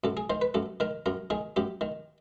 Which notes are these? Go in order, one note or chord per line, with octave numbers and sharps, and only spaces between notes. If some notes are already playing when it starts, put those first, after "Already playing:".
F#2 A4
G#4
D#3 C5
B4
F#2 A4
D#3 A#4
F#2 A#4
D#3 G#4
F#2 G4
D#3